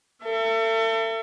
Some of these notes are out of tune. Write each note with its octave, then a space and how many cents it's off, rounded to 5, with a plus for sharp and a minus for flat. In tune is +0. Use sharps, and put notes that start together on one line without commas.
A4 +35 E5 +35